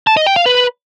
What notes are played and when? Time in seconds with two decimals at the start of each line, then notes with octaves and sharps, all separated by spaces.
0.07 A5
0.17 D#5
0.27 G5
0.36 F5
0.46 B4